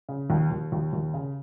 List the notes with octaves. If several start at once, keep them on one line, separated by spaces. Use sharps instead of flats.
C#3
D#2
D#2
D#2
D#2
C#3